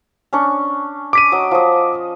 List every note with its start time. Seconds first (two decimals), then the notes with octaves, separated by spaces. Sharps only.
0.33 C#4 D4 C#6
1.13 D6 B6 D#7
1.32 F#3 D#5
1.51 F3 D#5